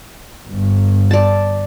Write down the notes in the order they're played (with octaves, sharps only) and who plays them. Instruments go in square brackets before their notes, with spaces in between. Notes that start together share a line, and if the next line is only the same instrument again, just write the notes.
[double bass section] G1
[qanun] D5 A5